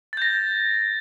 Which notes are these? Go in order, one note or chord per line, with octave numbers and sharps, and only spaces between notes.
G6 A6 A#6